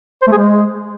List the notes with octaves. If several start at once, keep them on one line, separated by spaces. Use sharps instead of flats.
C5
A3
G#4
G#3